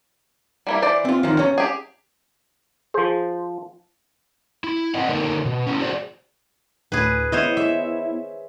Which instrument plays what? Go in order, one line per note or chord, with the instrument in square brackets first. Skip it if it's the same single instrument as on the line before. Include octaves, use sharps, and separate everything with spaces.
[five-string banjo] G3 A#3 E4
E3 C5 D5
[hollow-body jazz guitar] C4 F4
D2 D#3 F3
C#4 A#5
[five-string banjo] G4 G#4
[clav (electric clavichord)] F3 C5 [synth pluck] G#4
[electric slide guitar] E4
C4 D5 D#5 F#5
D3 A#3 D#4 A4 A#4
B2
C#4 D#4 E4
F#4 G#4 C5 D5
[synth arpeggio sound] D2 A2 [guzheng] G#4 B4
[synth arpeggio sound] B3 E4 [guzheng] C5 C#5 D#5
[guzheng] E5